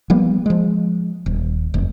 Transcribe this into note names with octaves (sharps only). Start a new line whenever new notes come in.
F3 G3 A#3 B3
F3 G#3
D#1
F1